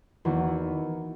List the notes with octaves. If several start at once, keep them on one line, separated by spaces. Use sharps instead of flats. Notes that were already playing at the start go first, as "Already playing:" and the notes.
E2 D#3 A#3 F#4
E4